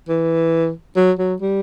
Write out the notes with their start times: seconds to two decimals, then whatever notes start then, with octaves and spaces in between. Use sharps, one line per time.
0.09 E3
0.96 F#3
1.19 F#3
1.41 G3